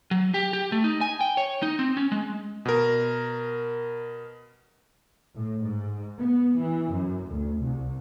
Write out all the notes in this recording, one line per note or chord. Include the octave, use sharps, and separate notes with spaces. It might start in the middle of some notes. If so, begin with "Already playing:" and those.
F#3
G4
G4
A3
D#4
G#5
G5
C#5
D#4
C4
C#4
G#3
B2 A#4
A2
G#2
B3
E3
F#2
D2
C2